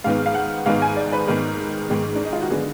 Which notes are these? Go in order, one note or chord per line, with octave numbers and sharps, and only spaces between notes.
G#2 D#3 G#3 B3 F5
F5
F#5
G#2 D#3 G#3 B3 F5
G#5
D5
B4
G#2 D#3 G#3 B3 A#4
G#2 D#3 G#3 B3
D4
D#4
F4
F#4
D3 G#3 B3 G#4